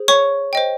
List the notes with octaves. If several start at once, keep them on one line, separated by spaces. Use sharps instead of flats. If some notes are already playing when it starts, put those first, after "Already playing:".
Already playing: G#4 C5
C#5 C#6
C5 D#5 G5